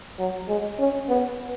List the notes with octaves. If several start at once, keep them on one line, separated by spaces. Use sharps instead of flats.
F#3
G#3
C#4
B3